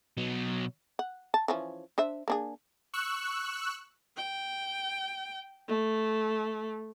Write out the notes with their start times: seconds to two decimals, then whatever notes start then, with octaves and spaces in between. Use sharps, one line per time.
0.17 B2 F#3
0.99 F#5
1.34 A5
1.48 E3 F3 C#4
1.98 D4 C5 E5
2.28 A#3 D4 G#4
2.94 C#6 E6 F#6
4.17 G5
5.68 A3